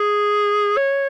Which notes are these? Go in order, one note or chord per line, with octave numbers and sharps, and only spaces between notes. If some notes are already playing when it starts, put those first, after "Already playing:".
Already playing: G#4
C#5